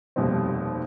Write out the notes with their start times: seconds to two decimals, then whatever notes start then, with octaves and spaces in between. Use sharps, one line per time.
0.16 F1 D#2 B2 D#3 G3 C4